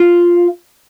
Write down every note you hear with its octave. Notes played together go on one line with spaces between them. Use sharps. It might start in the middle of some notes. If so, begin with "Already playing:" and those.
Already playing: F4